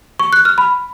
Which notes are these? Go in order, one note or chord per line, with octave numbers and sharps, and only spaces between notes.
C#6
F#6
F6
B5